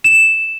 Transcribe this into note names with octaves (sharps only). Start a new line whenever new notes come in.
E7